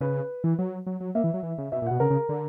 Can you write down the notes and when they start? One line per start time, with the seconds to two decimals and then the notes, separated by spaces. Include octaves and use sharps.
0.01 C#3 B4
0.44 E3
0.59 F#3
0.87 F#3
1.00 F#3
1.15 A#3 E5
1.24 E3
1.34 F#3
1.43 E3
1.58 C#3
1.72 B2 E5
1.82 A#2
1.86 B2 F#5
2.00 C#3 A#4
2.10 C#3
2.29 D3